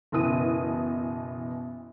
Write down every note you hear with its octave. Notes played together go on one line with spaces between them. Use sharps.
F#1 B2 E3 D#6 D#7